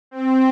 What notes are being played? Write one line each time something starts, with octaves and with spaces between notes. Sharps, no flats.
C4